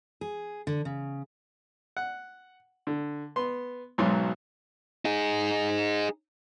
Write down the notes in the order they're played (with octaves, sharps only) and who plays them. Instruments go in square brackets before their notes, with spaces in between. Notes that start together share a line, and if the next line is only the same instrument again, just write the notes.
[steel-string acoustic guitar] G#4
D3
C#3
[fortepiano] F#5
D3
B3 C6
B1 G#2 B2 F#3 C6
[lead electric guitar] D#4 G#4